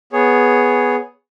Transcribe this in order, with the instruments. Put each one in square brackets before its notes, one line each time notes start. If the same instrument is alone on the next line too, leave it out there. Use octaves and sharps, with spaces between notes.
[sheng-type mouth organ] B3 G#4 C#5